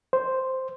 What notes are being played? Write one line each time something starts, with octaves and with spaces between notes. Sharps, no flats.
C5